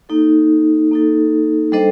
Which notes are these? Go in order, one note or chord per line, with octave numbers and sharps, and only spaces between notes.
A#3 D#4 A4
A#3 D#4 A4
G3 D4 A4 C5 D#5